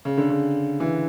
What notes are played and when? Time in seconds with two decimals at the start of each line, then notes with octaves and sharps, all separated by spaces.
0.05 C#3
0.17 D3
0.30 C#3
0.80 E3